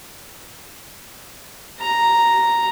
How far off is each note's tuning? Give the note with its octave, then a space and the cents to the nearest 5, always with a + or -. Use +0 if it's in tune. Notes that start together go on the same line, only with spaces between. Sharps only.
A#5 +0